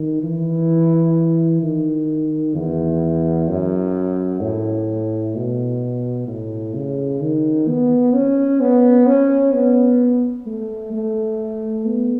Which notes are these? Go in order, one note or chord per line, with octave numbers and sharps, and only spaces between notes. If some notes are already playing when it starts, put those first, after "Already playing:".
Already playing: D#3
E3
D#3
E2
F#2
A2
B2
A2
C#3
D#3
B3
C#4
B3
C#4
B3
A3
A3
B3